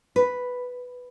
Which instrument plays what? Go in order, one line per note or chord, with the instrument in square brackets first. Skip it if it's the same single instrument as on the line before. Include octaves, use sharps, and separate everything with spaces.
[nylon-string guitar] B4